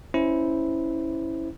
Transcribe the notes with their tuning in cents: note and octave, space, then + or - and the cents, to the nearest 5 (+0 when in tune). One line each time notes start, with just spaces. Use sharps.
C#4 +0 E4 -10 C5 -15